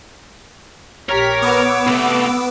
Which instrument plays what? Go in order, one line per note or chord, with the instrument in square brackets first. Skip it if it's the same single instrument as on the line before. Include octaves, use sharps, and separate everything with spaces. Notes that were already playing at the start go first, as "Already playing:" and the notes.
[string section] A#1 G4 B6 [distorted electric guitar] A#4 A#5 [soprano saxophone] C#5
[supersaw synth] B3 [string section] D6 E6
[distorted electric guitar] C2 A3